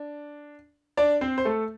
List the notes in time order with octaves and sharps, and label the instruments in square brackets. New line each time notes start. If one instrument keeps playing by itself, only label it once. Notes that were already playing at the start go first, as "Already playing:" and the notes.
Already playing: [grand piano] D4
D4 D5
C4 C5
C5
A3 A4